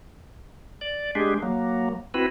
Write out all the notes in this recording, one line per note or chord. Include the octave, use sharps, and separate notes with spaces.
D5
G#3 D4 G4 G#4
F#3 A#3
C4 E4 F#4 B4